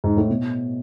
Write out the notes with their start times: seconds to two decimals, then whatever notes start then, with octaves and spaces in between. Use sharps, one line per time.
0.04 G#2
0.17 A2
0.30 B2